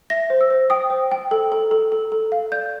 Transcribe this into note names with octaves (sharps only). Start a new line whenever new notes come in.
E5 A#6
C5
E6
C5
G5 D#6
C5
G5
A4
A4
A4
A4
A4
F5
D5 G6